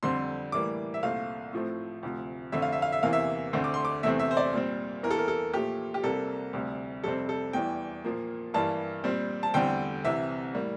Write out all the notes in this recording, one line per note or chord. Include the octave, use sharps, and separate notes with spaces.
F2 D3 G3 C4 C6
A2 E3 G3 A#3 D6
E5
C2 A#2 A3 C4 F5
A2 F3 A3 C4
D2 C3 F3
F2 D3 A3 E5
F5
E5
F5
E5
E2 C3 E3 A#3 F5
E5
D2 D3 A3 C4
D6
C6
D6
E2 C3 E3 A3 C4 E5
E5
C5
D5
A#2 G3 C4
E2 E3 A#3 A#4
A4
A#4
A4
A#2 F3 A3 G4
G4
C2 C3 G3 A#3 A4
D2 C3 G3
F2 C3 G3 C4 A4
A4
E2 E3 G3 G5
A#2 F3 A#3
G2 E3 G3 A#3 A5
A#2 G3 C4
A5
E2 D3 G3 C4 G5
C2 C3 E3 E5
A2 G3 A#3